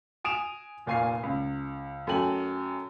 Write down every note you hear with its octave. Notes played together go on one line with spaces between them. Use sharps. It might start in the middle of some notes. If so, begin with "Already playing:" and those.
G#5 D#6 D7 E7 F7
F1 A#2 F5 G#5 C#6 C7
C#2
F#2 A3 G5 G#5 F#7